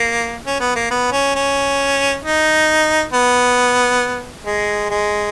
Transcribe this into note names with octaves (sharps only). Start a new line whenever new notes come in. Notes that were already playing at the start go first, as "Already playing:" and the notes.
Already playing: A#3
C#4
B3
A#3
B3
C#4
C#4
D#4
B3
G#3
G#3